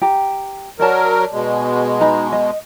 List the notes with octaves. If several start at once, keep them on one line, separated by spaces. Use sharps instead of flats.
G4 A#5
F#3 A#4 C#5 D5 A5
B2 G#3
D#4 A#5 B5
D#5